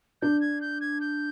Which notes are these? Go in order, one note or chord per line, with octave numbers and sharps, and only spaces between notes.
D4 G6
G#6
G6
G#6
G6